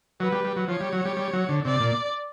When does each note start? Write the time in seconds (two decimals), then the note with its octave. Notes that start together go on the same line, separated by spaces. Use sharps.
0.20 F#3 B4
0.32 G3
0.44 G3
0.56 F#3
0.68 F3 C#5
0.81 G3
0.93 F#3
1.05 G3
1.17 G3
1.33 F#3
1.49 D3
1.65 C3 D5
1.80 A#2